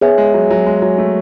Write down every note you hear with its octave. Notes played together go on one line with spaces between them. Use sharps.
B3 G#4 C#5 E5 G#5
G#3
F#3
F#3
G#3
F#3
A3